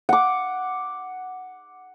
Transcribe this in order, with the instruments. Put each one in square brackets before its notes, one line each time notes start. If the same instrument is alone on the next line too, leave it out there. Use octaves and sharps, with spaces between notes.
[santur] F#5 D6